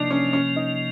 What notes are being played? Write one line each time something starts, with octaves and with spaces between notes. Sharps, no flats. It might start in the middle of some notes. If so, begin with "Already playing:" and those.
Already playing: C3 F3 A#3 D4 D#4
C#4
C#4
D#4